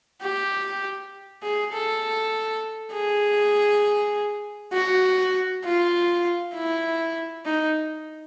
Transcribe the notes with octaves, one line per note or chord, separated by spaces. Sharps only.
G4
G#4
A4
G#4
F#4
F4
E4
D#4